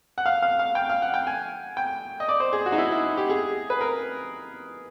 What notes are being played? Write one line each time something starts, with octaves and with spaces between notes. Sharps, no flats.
F#5
F5
F5
F5
G5
F5
F#5
G5
G#5
G5
D#5
D5
C5
G#4
F#4
D#4
E4
E4
G4
G#4
B4
A#4